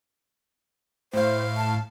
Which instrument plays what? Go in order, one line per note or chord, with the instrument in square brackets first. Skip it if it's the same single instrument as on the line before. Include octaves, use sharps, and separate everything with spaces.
[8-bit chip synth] A2 F5 [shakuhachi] C5
[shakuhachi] A5